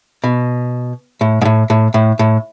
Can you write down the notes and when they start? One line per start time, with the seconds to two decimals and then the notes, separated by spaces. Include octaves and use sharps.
0.24 B2
1.21 A2
1.41 G#2
1.45 A2
1.70 A2
1.94 A2
2.19 A2